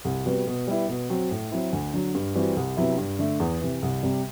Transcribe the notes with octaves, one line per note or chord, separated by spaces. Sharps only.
C2
C3 G3 B3 F#4
B2
G3 B3 E4
B2
F#3 C4 F#4
A2
F#3 C4 E4
D2
D3 F#3
G2
E3 G3 C4 F#4
C2
C3 F#3 B3 E4
G2
D3 A3
E2
C3 E3
C2
C3 G3